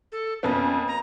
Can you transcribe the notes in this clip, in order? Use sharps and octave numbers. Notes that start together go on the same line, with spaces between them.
A4
F2 A#3 B3 C#4
A#5